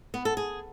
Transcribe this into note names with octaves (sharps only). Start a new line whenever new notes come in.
B3
A4
G#4